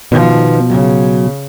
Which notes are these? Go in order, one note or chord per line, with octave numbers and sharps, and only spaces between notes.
B2 D#3 F3 B3
C#3 F#3